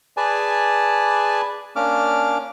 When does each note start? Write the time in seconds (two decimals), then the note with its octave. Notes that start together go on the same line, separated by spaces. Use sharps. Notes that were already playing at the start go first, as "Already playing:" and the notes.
0.17 G#4 B4 D5 G#5 A5
1.76 A#3 C#4 D4 D6 F6